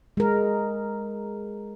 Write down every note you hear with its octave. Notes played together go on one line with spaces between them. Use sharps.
G#3 A#4